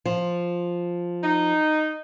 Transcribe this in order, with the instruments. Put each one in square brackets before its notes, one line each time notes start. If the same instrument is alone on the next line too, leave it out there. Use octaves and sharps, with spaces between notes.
[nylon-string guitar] F3
[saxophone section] D#4